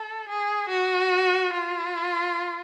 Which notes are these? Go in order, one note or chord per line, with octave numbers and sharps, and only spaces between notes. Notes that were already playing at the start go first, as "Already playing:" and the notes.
Already playing: A4
G#4
F#4
F4